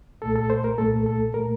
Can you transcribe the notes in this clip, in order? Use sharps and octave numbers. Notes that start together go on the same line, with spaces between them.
C2 A#2 A3 A4
A4
C5
A#4
C2 A#2 A3 A4
A4
A#2 A3 A#4